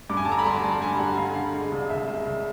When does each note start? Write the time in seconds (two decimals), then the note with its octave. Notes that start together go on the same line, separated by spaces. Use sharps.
0.10 G2 D6
0.17 G#5
0.25 A5
0.28 D3 A#5
0.38 B5
0.45 G3 C6
0.64 G3 A5
0.81 G2 G#5
0.99 G3 F#5
1.17 D3 F5
1.36 D3
1.54 G#3
1.72 C2
1.89 C2 E5
2.08 G#3
2.26 C2